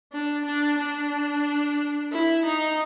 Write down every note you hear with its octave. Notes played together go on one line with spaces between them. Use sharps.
D4
D4
D4
E4
D#4